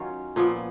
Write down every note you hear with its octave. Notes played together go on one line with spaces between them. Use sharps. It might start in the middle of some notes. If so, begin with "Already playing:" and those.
Already playing: D#3 F#3 C#4 F4
A#2 F3 B3